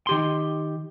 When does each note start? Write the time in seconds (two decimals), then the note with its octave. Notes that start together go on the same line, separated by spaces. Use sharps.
0.07 D#3 G4 C6